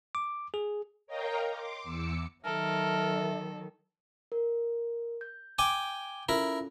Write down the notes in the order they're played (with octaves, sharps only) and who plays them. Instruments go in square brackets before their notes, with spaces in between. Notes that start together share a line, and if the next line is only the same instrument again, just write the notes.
[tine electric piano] D6
G#4
[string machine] A#4 C#5 D#5 F5 G5 A#5
C6 D6
E2 D6 E6 C#7
[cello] D#3 F#3 [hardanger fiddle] A4 [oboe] A#4 [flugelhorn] E5
[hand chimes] A#4
G6
[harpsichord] G5 G#5 D6
[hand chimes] C#4 F4 A4 [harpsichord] E4 A#4